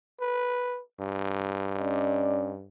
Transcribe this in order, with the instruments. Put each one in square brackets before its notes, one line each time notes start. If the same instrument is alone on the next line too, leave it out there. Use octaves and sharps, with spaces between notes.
[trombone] B4
G2
[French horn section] C#4 D5 D#5